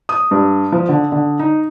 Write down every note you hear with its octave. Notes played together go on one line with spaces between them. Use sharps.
D#6
G2
F3
D3
D3
D#4